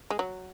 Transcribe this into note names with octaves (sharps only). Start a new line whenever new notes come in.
G#3
F#3